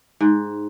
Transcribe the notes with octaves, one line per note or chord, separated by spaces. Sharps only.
G#2